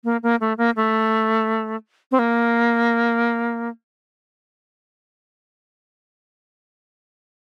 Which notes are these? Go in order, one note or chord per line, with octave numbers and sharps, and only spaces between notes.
A#3
A#3
A3
A#3
A3
C4
A#3